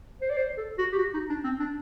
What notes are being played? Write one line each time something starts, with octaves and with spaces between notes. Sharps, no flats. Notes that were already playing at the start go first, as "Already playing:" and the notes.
C5
D5
C5
A4
F#4
G4
F#4
D#4
D4
C4
D4